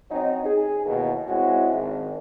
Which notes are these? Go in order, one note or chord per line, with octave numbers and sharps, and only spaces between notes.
F#3 C4 C#4 D#4
G#4
D#2 B2 D#3 E3
G#3 C4 C#4 E4 F#4
G#1